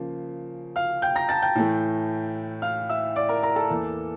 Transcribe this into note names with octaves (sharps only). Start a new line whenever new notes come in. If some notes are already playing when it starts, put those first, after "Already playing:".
Already playing: C#3 F3 A#3
F5 F6
G5 G6
A#5 A#6
A5 A6
G5 G6
A2 E3 A3
F5 F6
E5 E6
D5 D6
A#4 A#5
A#4 A#5
A4 A5
E2 E3 A#3